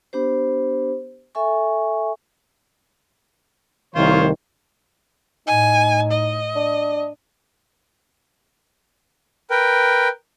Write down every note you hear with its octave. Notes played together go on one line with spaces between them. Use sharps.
B3 D4 G4 C5
A4 E5 G#5 C#6
C2 A2 D#3 F4 C5 C#5
A2 D#4 G#5
D#5
D4
A#4 B4 G5